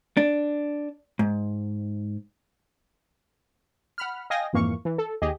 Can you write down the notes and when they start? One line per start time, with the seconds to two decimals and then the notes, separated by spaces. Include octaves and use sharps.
0.17 D4
1.19 G#2
3.98 F#5 B5 F6
4.30 D#5 F5 G5 G#5 D#6 A#6
4.53 F2 G#2 E3 A#3 F5 C#6
4.85 E3
4.98 A4
5.22 D#2 G4 G#4 D#5